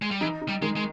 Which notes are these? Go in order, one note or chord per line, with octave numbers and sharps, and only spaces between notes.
G#3
G3
E3 D#4
D#4
G3
D#3 G#3
G#3